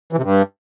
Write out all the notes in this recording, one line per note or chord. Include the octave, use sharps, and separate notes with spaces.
E3
C3
G2